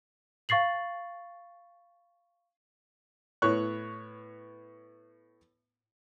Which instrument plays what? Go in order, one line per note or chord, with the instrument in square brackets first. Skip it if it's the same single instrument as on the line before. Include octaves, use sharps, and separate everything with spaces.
[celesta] F5 C#6 A6 C7 F#7
[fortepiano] A2 B3 C#5 C#6 F#6